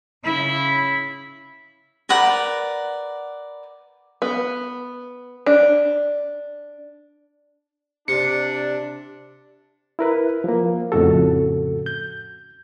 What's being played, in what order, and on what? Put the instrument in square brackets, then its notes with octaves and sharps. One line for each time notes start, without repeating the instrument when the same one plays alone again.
[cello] C#3 E4
[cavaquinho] A#4 B4 D5 F#5
[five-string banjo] B3
D4
[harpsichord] C3 [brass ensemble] D4 [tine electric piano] C#7
[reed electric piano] E4 A#4 B4
F3 A#3
F2 A2 C#3 F#4 A4
G6